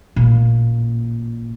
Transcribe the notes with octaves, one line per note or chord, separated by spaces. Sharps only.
A1 A#2